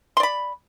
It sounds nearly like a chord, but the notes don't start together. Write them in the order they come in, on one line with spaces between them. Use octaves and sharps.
C6 D5 B5